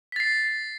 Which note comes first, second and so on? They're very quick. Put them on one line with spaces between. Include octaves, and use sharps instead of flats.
B6 A6 C7